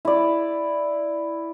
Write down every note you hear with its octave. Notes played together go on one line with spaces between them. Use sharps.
E4 D5